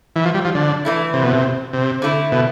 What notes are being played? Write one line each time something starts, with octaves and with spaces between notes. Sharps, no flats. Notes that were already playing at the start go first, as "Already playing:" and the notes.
E3
F3
G3
F3
D3
E3 A3 E4
C3
B2
C3
C3
D3 A3 E4
B2